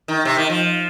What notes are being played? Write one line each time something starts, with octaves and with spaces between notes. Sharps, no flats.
D#3
C3
D#3
F3